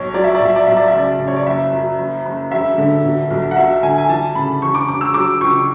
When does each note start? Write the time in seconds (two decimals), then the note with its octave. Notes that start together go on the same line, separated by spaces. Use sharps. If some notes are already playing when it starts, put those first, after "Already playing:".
Already playing: B1 C#5
0.14 F#3 D5
0.24 E5
0.35 D5
0.40 B1
0.45 E5
0.56 D5
0.67 B1 E5
0.77 D5
0.87 E5
0.93 C#3 D5
1.19 C#3
1.28 C#5
1.36 D5
1.46 F#1 E5
1.72 F#2
1.98 F#1
2.25 F#1
2.51 E1 E5
2.78 D3
3.03 B2
3.30 B1
3.51 F#5
3.57 F#3 E5
3.83 D3 G#5
3.98 G#5
4.09 E3 A5
4.35 C#3 B5
4.62 E1 C#6
4.75 D6
4.88 E1 D6
5.01 E6
5.14 F#3 D6
5.40 C#2 C#6